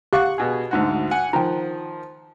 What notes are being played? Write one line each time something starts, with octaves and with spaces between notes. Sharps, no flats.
G4 F5 F#5 C#6 F#6
B2 G#4
D2 G#2 F#4
F#5 G#5
D#3 F3 G5 A#5